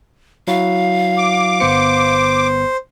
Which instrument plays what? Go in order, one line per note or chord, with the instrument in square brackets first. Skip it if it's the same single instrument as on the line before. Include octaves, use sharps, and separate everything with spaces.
[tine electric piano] F#3 E4 F#4 [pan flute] F5
[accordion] D6
[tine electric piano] G1 B3 C#7 [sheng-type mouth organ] C5